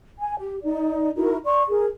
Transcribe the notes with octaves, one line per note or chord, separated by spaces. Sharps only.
G#5
G4
D#4 D5
D#4 E4 F#4 A#4
D5 C6 C#6
G#4 A#4